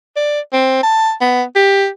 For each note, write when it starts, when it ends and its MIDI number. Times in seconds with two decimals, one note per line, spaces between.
0.16 0.40 74
0.53 0.81 60
0.83 1.12 81
1.21 1.43 59
1.55 1.87 67